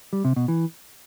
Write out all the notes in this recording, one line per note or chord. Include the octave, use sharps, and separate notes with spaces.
G3
C3
B2
E3